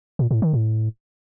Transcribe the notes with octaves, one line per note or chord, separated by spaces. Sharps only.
A#2
A2
D#3
A2